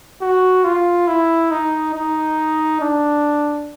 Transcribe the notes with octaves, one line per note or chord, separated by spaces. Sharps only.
F#4
F4
E4
D#4
D#4
D4